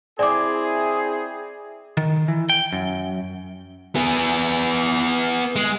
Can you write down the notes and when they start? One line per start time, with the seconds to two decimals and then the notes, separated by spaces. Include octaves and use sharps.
0.19 C4 E4 G#4 D5 D6
1.97 D#3
2.28 E3
2.49 G5
2.73 F#2
3.95 B3 G#4
5.56 G#3